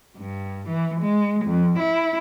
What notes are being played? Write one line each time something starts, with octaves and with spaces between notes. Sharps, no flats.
G2
E3
G#3
F2
E4